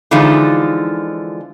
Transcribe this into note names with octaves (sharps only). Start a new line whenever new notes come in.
D3 E3 F3 G#3 D#4 F4